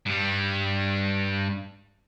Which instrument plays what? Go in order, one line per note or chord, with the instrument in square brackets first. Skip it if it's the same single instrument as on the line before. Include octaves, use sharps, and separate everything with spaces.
[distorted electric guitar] G2 G3